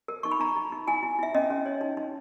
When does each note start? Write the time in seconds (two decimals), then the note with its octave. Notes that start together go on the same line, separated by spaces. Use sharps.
0.08 A#4
0.23 D#4 C#6
0.32 B5
0.40 D#4 A#5
0.56 D#4
0.72 D#4
0.87 E4 G#5
1.03 E4
1.19 E4 E5
1.35 C#4 D#5
1.50 C#4
1.66 C#5
1.81 D#4
1.97 D#4